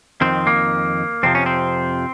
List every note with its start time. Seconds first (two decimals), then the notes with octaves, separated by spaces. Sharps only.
0.21 F2 D#3 C4
0.47 A#3
1.23 F2 C3 F3 C4
1.35 C#4
1.46 C4